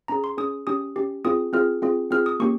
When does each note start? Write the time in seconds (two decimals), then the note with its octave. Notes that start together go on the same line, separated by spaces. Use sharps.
0.08 C#4 G#4 A#5
0.24 C6
0.37 C#4 G#4 D#6
0.67 C#4 G4 D#6
0.96 C#4 G4
1.25 C4 F4 G#4 D#6
1.53 C4 F4 G#4 F6
1.82 C4 F4 G#4
2.11 C4 F4 G#4 F6
2.26 D#6
2.40 A#3 C#4 G4 C#6